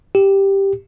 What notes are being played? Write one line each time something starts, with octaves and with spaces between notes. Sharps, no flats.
G4